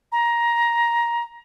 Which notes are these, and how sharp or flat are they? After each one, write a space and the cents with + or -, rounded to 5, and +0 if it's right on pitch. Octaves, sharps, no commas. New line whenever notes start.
A#5 +15